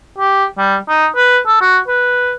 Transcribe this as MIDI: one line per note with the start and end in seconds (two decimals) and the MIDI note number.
0.18 0.45 67
0.58 0.77 55
0.89 1.06 63
1.16 1.39 71
1.47 1.58 69
1.61 1.78 66
1.88 2.35 71